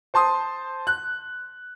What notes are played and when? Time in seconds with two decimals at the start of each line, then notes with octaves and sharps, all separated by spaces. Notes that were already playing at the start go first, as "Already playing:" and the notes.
0.14 C5 A5 C6 D#6
0.87 F#6